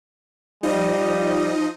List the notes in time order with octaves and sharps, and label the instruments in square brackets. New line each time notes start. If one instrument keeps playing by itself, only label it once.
[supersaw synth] F3 D#4 D#5 [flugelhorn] G3